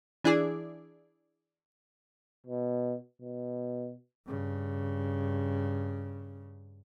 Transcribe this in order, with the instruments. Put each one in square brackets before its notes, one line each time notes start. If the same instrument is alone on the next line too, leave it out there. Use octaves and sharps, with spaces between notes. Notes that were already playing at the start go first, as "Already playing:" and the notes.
[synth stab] E3 D4 E4 G#4 D5
[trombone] B2
B2
[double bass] G2 C#3